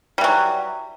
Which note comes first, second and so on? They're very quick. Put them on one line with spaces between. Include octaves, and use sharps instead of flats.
G3 E3 F#3